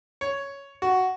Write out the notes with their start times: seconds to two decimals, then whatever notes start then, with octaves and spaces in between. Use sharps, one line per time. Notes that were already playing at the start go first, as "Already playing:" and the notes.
0.21 C#5
0.82 F#4